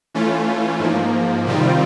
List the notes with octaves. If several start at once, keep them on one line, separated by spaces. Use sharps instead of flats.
E3 A3 C#4 F4
G#2 F3 A#3
C3 D#3 G3 C4 F4